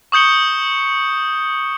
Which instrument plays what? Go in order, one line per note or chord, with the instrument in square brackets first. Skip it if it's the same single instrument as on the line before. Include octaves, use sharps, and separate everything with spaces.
[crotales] C#6 D#6 G6 C#7 G7